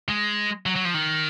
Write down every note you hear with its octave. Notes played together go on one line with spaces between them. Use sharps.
G#3
F#3
F#3
F3
D#3